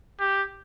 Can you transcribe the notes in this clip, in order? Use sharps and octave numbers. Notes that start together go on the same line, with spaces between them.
G4